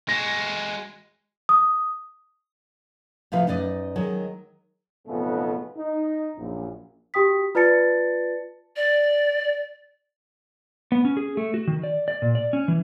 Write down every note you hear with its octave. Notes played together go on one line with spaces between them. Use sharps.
G#3 F#4 A#6
D#6
A2 C3 F3 B4 F5
F#2 D#4 B4 D5 D#5
D#3 F#3 G#3
B1 F2 G#2 C#3 A3 B3
D#4
A#1 F#2
F#4 G4 G5 D#6 B6
F4 B4 D5 A5 A6 C#7
D5
B3
C#4
G#4
A3
F#4
D#3
D5
D5
A#2
D5
C#4
E3